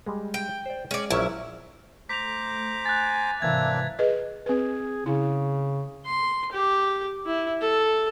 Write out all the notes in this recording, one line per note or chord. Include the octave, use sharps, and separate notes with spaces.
G3 G#3
G5
C5 D5
G#3 C#4 D5
A#1 F#3 C#4 E4
A3 C5 A#5 D6 B6 F7
G#5 F#6 A6
G#2 C3 E3 A#3 C4 D4 E5 G#6
G#4 B4 D#5
C4 G#4 B4
C#3 E4
C6
G4
E4
A4